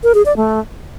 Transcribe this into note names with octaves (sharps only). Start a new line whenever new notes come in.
A#4
G#4
D5
A3